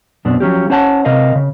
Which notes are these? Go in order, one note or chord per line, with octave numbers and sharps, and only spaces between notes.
F#2 B2 C4 D4
F3 F#3 C#4 G4
C#4 C5 C#5 F#5 A5
C3 C4 A#4 D#5 F5
C#3